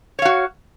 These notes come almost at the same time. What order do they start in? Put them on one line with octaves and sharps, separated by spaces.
C#5 F5 F#4